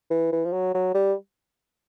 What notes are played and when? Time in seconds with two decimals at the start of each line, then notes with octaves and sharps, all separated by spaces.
0.10 E3
0.32 E3
0.45 F3
0.52 F#3
0.74 F#3
0.94 G3